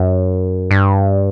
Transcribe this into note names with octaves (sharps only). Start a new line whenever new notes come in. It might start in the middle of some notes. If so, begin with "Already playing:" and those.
Already playing: F#2
G2